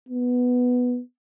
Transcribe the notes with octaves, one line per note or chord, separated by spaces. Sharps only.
B3